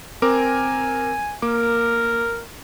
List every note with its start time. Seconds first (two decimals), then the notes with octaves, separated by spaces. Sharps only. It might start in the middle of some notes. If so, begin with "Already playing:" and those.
0.22 C4 A#4 G#5 D6
1.42 A#3 A#4 D6